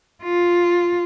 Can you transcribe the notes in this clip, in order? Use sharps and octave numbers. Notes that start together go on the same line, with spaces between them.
F4